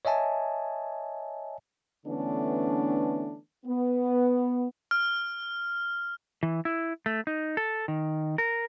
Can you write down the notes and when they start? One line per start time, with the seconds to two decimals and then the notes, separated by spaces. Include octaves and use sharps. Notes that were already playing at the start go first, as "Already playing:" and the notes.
0.05 C#5 D#5 E5 G#5 A5
2.06 D3 E3 A3 B3 C#4 D4
3.66 B3
4.91 F6
6.43 E3
6.65 E4
7.06 A3
7.27 D#4
7.57 A4
7.88 D#3
8.38 A#4